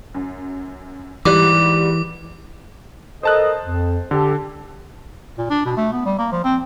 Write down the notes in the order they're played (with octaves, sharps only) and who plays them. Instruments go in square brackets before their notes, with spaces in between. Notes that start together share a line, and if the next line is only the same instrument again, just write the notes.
[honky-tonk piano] F#2
[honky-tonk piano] G#2 G3 F#6 [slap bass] E3 [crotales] D6
[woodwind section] A4 A#4 D#5 [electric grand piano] C5 A5 F#6
[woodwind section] F2
[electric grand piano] D3 [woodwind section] G4 A4
[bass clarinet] A#2
D4
B2
A3
B3
G3
A#3
F3
C4